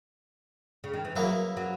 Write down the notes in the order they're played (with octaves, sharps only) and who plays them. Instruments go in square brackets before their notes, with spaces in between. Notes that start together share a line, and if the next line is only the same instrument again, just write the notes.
[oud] C#3
D#3
E3
[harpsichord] F#2 C#3 E3 A#3 E4 [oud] F#3
[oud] F#3